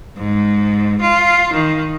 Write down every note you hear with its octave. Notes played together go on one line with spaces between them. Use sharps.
G#2
F4
D#3